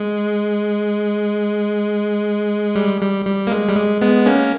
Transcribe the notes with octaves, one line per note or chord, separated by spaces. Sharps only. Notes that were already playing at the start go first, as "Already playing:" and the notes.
Already playing: G#3
G3
G3
G3
A#3
G#3
G3
G#3
G#3 B3
A#3 C#4